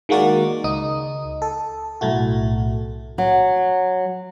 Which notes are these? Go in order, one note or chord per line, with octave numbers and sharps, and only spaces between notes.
D#3 G#3 A#3 F#4 A#4 D5
C#2 D#4 D#6
A4
B1 A2 A3 F#4
F#3